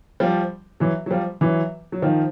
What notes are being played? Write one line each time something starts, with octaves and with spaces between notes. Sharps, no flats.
F3 G3
E3 F#3
F#3
F3 G3
E3 F#3
F#3
D#3 F3